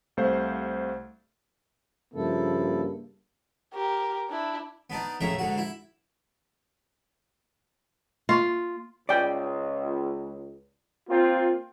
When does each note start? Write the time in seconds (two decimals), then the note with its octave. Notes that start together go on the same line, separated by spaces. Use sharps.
0.17 C2 A3 C5 F5
2.14 G2 C#3 F3 A#3 E4 A4
3.74 G4 A#4
4.29 D4 E4
4.90 B3 D4 D#4
5.21 A1 A2 C#3 A#4 E5
5.39 G#2 D3 F#4
5.58 E4
8.29 A#3 F4 C#6
9.09 C#2 D5 G5
11.09 A#3 C4 F4